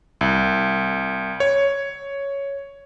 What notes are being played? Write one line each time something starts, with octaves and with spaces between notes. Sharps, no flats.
C2
C#5